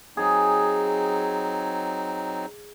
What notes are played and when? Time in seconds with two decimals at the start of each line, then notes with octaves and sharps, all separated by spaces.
0.17 F#3 C4 D#4 G#4